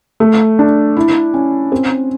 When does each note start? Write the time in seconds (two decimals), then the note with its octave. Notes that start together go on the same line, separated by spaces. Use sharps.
0.20 A3
0.59 D4
0.97 E4
1.34 C#4
1.72 C4